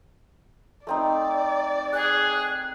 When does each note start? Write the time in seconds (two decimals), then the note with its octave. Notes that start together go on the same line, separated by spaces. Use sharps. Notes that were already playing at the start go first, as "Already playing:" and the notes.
0.87 A3 C4 D#4 D5
1.93 G#4 F#6